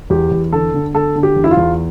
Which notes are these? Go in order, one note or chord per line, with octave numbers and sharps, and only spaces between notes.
E2 G4
E2
D3 A4
D3
D3 A4
D3
G4
E2
E4
F4
E2